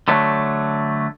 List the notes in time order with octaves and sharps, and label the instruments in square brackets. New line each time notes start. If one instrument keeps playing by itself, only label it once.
[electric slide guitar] D3 F#3 A3